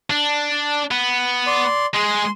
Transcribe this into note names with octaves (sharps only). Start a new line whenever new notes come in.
D4
B3
D5 C6
G#3 G#4 C6